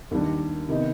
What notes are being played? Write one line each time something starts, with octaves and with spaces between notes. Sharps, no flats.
D#2 D#3 G3 D4
C3 D#3 B3 D#4